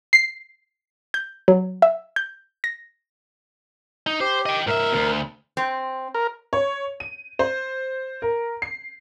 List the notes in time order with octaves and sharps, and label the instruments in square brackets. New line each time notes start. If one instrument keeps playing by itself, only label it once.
[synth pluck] C7
G6
F#3
E5
G6
A#6
[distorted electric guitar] D#4
[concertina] G4 [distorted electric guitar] C5
[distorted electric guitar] D#5 G5
[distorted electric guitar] G#2 E5 [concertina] A#4
[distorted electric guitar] D2 B2
[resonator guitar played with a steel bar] C4
[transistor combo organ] A#4
[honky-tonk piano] C#5
D#7
C5
A#4
C7